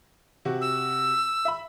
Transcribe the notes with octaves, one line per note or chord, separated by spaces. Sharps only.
C3 F#4
E6
E5 B5